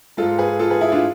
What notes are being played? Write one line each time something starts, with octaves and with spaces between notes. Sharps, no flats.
G#2 G#3 F4 A4
G#4 B4
F4 A4
G#4 B4
E4 G#4
D4 F4